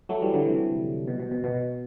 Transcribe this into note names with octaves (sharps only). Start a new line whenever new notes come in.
F#3 A3
E3 G3
D3 F#3
C3 E3
B2
B2
B2
B2